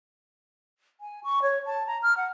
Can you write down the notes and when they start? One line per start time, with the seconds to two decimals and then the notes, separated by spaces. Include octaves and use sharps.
1.01 G#5
1.24 C#6
1.42 C#5
1.66 A5
1.87 A#5
2.03 F6
2.17 F#5